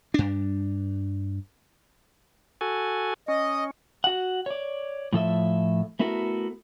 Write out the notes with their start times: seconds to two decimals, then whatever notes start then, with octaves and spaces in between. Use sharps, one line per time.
0.14 G2 D4
2.61 F#4 A4 G#5
3.28 C#4 D#5
4.04 F#4 F#5
4.46 C#5 D5
5.13 A2 F3 A4 E5
5.99 A3 B3 E4 F#4 A4 A#4